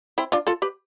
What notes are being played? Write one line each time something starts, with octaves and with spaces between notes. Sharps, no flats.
C4 E4
D4 F4
F4 A4
G4 B4